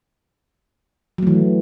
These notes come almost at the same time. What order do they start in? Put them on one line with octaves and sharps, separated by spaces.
F#3 A3 E3